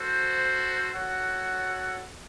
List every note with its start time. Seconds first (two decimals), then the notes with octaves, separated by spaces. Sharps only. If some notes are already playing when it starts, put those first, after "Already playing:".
Already playing: F#4 A4 C5
0.93 F#4 A4 C#5 F#5